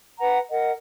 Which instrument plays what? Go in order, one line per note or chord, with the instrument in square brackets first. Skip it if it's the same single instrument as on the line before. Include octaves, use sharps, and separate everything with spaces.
[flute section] B4 F#5 A#5
A#4 D#5 F#5